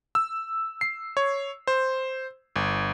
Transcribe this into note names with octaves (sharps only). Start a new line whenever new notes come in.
E6
C7
C#5
C5
G1